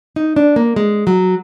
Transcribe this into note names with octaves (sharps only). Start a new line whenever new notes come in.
D#4
D4
A#3
G#3
F#3